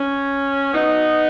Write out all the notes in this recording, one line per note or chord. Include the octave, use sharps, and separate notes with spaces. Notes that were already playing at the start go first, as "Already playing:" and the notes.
Already playing: C#4
B2 F#3 B3 D#4